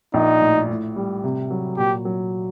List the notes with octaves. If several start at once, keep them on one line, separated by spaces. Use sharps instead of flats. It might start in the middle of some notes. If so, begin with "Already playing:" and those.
A#1 D#4
A2
A2
G3
C3
F#3
A#2 G4
F#3